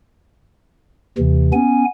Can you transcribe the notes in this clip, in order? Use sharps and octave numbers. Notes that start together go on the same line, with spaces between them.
D#2 C3 E3
B3 C#4 G#5